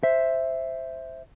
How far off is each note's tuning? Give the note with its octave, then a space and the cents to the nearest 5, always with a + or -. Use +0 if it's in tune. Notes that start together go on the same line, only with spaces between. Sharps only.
C5 +0 E5 +0